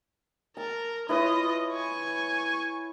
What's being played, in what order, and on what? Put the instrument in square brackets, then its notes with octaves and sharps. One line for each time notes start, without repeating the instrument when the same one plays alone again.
[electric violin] A#4 [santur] A5
[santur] E4 B4 C#5 [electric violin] F4 D#5
[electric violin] G#5 C#6